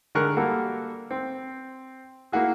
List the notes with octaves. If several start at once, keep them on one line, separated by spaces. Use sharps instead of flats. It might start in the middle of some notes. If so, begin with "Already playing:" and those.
D3 G#3 A#4 C#6 F#6
G3 A#3 F#4 A4
C4
A#3 E4 F#4 G#4